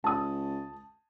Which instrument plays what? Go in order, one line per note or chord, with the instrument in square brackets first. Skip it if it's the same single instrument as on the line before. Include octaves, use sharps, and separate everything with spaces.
[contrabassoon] C#2 [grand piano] A5 D#6